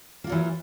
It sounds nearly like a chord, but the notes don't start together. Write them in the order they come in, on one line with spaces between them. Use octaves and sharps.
A#3 F4 F#3 E3